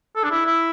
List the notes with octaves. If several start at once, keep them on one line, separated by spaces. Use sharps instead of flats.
A4
D4
E4
E4